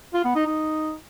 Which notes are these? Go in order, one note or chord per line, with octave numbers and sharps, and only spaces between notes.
F4
B3
D#4
D#4